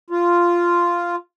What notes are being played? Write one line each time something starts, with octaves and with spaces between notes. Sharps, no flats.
F4